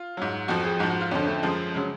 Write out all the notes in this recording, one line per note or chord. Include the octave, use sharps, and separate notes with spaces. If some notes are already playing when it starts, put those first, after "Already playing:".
Already playing: F4
G#2 F#3
F2 F3 F#4
G#4
G#2 F3 F#4
F#4
F4
F2 D3 F3 C#4
A3
F#2 F3 G#3
C#3 F#3 G#3